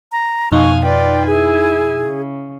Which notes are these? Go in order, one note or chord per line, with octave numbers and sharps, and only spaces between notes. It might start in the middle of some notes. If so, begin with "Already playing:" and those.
A#5
F2 B2 D#4 F5 G#5 C#6
F4 B4 D5 G5
E4 G#4 G#5
C#3